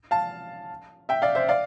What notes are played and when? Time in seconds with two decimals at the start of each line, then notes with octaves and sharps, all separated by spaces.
0.11 F5 A5
1.09 E5 G5
1.22 D5 F5
1.35 C5 E5
1.49 D5 F5